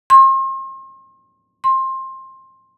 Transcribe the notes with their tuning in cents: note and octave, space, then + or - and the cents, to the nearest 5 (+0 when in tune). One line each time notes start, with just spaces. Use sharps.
C6 +40
C6 +20